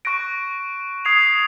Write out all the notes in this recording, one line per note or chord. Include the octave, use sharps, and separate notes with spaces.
C#6 F#6 A#6 D7
D#6 G#6 C7 F7